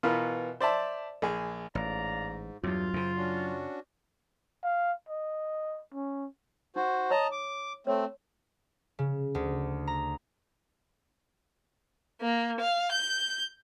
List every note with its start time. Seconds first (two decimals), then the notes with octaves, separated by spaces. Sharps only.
0.03 B2 E3 B3 F4 A#4
0.60 C5 D5 E5 A5
1.22 A#1 G#4
1.75 A1 G#2 D5 F5 A#5
2.64 E2 G2 F#3 F4
2.94 F#2 C#3 C5
3.17 C#4 D4 F#4
4.64 F5
5.09 D#5
5.94 C#4
6.76 D#4 F#4 C5
7.11 C#5 D#5 A5 A#5 C6 D#6
7.32 D6
7.87 A3 C4 C#5
8.99 C#3
9.35 D2
9.87 A#5
12.22 A#3
12.60 F5
12.92 G6